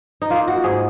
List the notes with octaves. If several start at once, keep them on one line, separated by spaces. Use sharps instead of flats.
D#4
A#3 F4
F#4
G#2 G#4